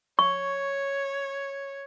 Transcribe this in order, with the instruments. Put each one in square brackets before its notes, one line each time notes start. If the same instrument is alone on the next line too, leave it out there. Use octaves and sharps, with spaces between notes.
[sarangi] C#5 [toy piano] C#6